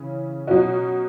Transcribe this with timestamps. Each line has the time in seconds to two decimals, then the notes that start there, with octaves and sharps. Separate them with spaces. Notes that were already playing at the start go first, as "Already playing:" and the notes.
Already playing: C#3 E3 C#4
0.47 B2 F#3 C#4 F#4